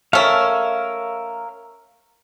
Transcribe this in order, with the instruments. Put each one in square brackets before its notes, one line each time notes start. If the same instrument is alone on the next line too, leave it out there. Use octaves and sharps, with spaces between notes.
[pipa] A3 C#4 [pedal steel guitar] A#4 E5 F5